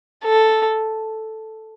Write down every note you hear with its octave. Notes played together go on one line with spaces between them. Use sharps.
A4